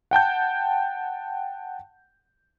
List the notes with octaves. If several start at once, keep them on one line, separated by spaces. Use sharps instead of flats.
F#5 G5 A5 G6